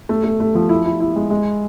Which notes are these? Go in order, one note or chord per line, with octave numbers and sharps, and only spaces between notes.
A3
A3
A3
F3
E4
E4
E4
G#3
G#3